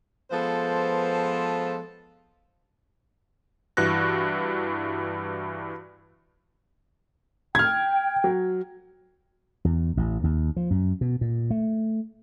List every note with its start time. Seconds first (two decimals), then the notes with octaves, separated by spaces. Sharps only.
0.30 F3 G#3 B3 A4 B4 C5
3.77 G2 E3 F#4 F#6 A#6
7.55 G5 F6 G#6
8.24 F#3
9.65 E2
9.97 A1
10.24 D#2
10.57 F3
10.71 F#2
11.01 B2
11.21 A#2
11.50 A3